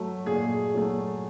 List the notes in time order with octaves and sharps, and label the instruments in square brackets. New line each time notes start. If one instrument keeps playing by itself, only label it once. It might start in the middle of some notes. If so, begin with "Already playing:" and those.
Already playing: [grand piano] F#3 A3
A#2 G#4
F#3 A3